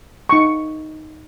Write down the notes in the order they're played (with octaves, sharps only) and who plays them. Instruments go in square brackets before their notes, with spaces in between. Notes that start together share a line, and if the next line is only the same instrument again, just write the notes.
[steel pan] D#4 C#6